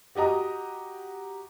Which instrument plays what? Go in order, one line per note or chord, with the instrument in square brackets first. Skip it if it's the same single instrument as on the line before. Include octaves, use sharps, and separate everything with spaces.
[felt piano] F#4 G4 D#5 A#5 D#6